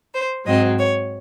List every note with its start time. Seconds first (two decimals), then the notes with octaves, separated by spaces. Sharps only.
0.14 C5
0.46 G#2 F#3 C4 D#5
0.78 C#5